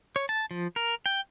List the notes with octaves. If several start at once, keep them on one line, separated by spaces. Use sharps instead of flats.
C#5
A5
F3
A#4
G5